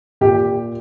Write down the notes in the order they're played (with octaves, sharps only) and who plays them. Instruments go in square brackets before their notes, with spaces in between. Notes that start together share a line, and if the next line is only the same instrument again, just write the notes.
[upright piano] A#2 G4